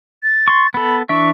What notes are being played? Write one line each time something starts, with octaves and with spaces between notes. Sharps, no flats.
A6
C6 C#6
B3 A4 B5
E3 D4 E5 C#6